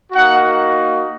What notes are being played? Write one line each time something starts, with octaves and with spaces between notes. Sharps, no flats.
A#3 D#4 F#4 F#5